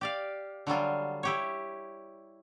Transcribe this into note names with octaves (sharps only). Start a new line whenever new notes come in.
G4 D5 F5
D3 F#3 G3 F4
E4 G4 C#5